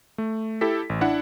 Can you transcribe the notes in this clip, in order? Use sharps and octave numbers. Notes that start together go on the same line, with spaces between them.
A3
E4 G4 A4 B6
A1
D4 E4 F#5